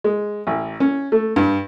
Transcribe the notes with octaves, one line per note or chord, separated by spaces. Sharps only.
G#3
A1
C#4
A3
G2